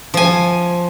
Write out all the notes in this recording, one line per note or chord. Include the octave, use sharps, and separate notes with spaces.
F3 G#5